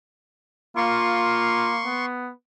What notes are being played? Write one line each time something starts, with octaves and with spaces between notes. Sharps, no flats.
A#3 F4 C6 C#6
B3